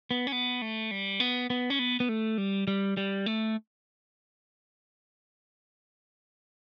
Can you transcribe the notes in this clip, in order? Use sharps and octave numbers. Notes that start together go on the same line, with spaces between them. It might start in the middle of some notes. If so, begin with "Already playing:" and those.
B3
C#4
B3
A3
G3
B3
B3
C#4
B3
B3
A3
G3
G3
G3
A3